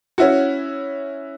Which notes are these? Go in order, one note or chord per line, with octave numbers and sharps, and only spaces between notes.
C#4 E4 F#4